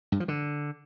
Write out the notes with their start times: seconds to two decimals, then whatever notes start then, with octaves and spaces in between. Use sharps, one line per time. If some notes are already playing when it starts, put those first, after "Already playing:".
0.12 G2
0.20 F3
0.28 D3